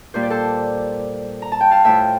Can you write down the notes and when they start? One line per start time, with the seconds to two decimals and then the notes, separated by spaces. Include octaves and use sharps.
0.14 A#2 G3 C5
0.23 D5
0.30 A4 C5
1.42 A#5
1.52 A5
1.61 G5
1.71 F5 A5
1.85 A2 F3 E5 G5